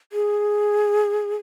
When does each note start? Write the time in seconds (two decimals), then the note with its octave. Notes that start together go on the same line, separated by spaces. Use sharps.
0.13 G#4